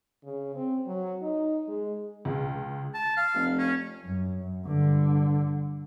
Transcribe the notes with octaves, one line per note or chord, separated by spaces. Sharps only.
C#3
C4
F#3
D#4
G#3
C#2
A5
F5
F1
C#4
F#2
G2 D3